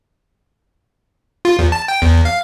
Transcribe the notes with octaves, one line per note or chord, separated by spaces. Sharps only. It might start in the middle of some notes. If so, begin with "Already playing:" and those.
F4
E2
A5
G5
E2
F5